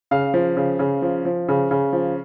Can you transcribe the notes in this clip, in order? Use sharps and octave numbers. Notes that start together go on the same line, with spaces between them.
C#3 F5
F3
C#3
C#3
F3
F3
C#3
C#3
F3